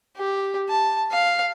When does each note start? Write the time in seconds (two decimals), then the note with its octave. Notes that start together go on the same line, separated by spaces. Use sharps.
0.17 G4
0.69 A5
1.11 F5